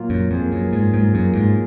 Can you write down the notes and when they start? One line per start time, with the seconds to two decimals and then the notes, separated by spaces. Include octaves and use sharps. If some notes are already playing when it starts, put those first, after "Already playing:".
Already playing: A#2 F#3 A#3 F4
0.10 F#2
0.31 F2 B2 F#3 A#3 F4 G#4
0.52 F#2
0.73 G#2
0.94 G#2
1.15 F#2
1.35 G#2